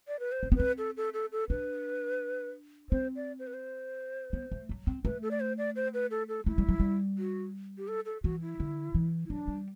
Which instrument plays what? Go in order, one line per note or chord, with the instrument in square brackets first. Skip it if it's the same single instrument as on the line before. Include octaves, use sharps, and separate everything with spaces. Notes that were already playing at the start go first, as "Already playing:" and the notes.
[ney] D5
B4
C5
[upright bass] C4
B3
[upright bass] C4 [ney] B4
[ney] A4
A4
A4
A4
[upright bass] D4 [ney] B4
[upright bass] C4 [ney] C5
[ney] D5
C5
B4
C5
[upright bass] B3
A3
F#3
C4
[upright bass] A3 [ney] B4
[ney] A4
D5
C5
D5
C5
B4
A4
A4
[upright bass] A3 [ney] E4
[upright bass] G3
F#3
G3
[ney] F#4
G4
A4
A4
[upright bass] E3 [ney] F#4
[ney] E4
[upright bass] D3
E3
[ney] E4
[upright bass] F#3 [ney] D4
[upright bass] G3